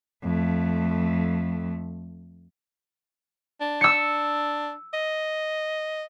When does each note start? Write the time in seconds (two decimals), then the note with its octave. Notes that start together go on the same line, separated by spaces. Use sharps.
0.23 F2 A3
3.61 D4
3.81 E6 C#7
4.94 D#5